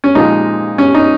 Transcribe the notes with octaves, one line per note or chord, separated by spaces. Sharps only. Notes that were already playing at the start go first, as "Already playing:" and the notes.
C#4
A#2 F3 G#3 D#4
C#4
D#4